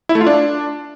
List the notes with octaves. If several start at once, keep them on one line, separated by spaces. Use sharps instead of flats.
E4
A3
F4
D4